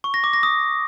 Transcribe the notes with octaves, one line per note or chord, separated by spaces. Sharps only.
C#6
A#6
D6
A#6
D#6